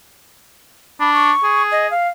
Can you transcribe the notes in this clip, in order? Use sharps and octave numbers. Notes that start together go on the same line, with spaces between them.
D4 B5
C#6
G#4
D#5
F5